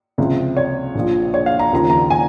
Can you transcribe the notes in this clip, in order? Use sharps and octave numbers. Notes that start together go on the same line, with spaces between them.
C#2 C3 F3
C#5
A#1 A#2 F3
C#5
F5
A#5
D#2 C#3 F3 A#5
A#5
G#5